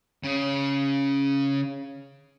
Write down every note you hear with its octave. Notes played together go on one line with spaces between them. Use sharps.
C#3